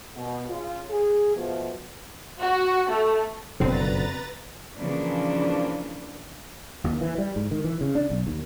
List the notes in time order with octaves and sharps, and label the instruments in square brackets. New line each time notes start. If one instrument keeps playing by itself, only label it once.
[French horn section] B2
C#3 F4
G#4
B2 F3 A3
[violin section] F#4
A3
[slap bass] F#1 B2 D3 [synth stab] F2 C4 [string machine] B4 A#5 A6
[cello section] C#3 E3 F3 A#3 D4 B4
[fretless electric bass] D#2
E3
G3
G#2
D#3
E3
C#3
D4
B1
D#2